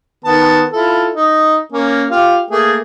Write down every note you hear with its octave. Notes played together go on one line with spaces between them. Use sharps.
D#3 B3 A5
E4 F4 A4
D#4
A#3 C#4
F4 G4 F5
A3 A#3 G#4